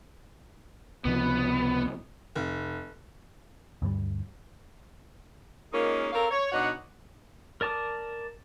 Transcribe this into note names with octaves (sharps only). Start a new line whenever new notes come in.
C#2 C3 F3 B3
F1
D2 G2 F#3 G3
G#3 A#3 C#4 D#4 F4 A#4
C4 A4 A#4 C#5 F5
C#5
B2 D4 D#4 C#5 F#5
A#4 D5 A5 D6 D#6